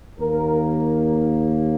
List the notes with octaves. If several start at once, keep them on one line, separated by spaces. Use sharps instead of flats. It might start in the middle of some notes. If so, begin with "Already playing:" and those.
D#2 D#3 A#3 A#4